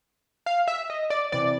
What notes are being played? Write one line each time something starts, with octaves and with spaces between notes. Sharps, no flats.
F5
E5
D#5
D5
C3 E3 D5